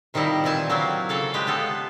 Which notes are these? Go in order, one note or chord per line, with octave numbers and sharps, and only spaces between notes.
C3 D#3 F3 G3 E4 A#5
A#2 E3 C4 G#5 A5
F#3 A#3 C4 E4 F4
C#3 A#3 A4 F5
G#3 G4 B4
B3 F4 A4